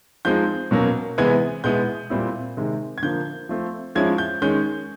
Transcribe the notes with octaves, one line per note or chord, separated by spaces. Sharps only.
F3 G#3 C4 D#4 G6
B2 F#3 A#3 C#4
C3 E3 G#3 B3 G#6
B2 G#3 B3 E4 G6
A#2 G3 C4 E4
C3 D#3 G#3
G#6
D3 F3 A#3 G6
F3 A3 C4
F3 G#3 C#4 E4 G#6
G6
D#3 G#3 C#4 G6